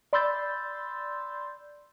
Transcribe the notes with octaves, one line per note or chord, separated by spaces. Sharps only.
D5 B5 C6 E6 G6 A6